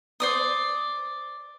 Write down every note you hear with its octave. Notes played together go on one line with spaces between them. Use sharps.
C5 D5 D#6